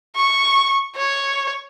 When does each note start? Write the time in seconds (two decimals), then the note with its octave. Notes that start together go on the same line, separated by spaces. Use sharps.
0.16 C#6
0.96 C#5